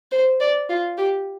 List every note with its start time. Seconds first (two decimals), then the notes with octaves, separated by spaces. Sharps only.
0.12 C5
0.40 D5
0.69 F4
0.98 G4